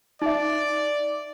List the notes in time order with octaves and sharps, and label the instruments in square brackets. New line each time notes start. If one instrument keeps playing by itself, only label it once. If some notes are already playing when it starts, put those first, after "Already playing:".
[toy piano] D#4 E5 [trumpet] D5